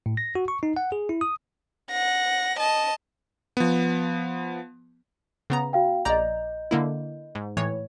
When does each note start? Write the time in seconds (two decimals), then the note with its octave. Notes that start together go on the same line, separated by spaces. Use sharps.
0.06 A2
0.17 A#6
0.35 F#4
0.48 C#6
0.63 D#4
0.76 F#5
0.92 G#4
1.09 E4
1.21 D#6
1.90 F#5 A#6
2.59 D#5 A5
3.57 F3 B3
5.50 C#3 B3 A#5
5.73 F#4 F5 G5
6.05 A#1 D5 D#5 A#5 G6
6.71 D3 A#3 E4
7.35 G#2
7.57 A2 E3 C#5